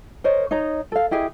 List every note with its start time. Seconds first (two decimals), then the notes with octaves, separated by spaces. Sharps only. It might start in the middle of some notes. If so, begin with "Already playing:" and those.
0.24 A#4 C5 C#5 D#5
0.51 D#4 C#5 D#5 A#5
0.92 A4 F5
1.11 E4 G4 G#4 D#5